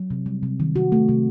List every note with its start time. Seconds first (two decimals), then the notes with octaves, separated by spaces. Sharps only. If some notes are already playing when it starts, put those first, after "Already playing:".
Already playing: F#3
0.10 C3
0.26 G3
0.43 C3
0.60 D#3
0.75 C3 F#4
0.92 A3
1.09 C3